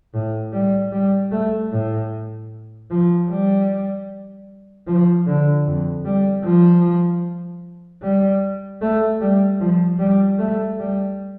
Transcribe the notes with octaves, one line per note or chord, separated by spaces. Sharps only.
A2
G3
G3
A3
A2
F3
G3
F3
D3
F2
G3
F3
G3
A3
G3
F3
G3
A3
G3